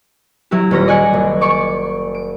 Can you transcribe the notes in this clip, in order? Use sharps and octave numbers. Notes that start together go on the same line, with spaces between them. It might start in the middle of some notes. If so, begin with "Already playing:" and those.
F#3 E4 F#4 G4
D#1 C#4 G4 A#6
D5 D#5 G#5 F#6 C#7
F#1
D5 C#6 D6
D7